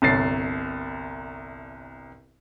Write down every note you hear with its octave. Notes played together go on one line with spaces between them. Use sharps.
G1 C2 C#5 A6 C7